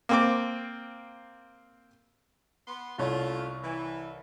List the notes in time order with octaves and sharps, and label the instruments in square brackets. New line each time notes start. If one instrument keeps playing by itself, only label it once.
[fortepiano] A#3 C4 D6
[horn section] B3 C6
[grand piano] C2 C#5 [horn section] A3 C#4 F4
[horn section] E3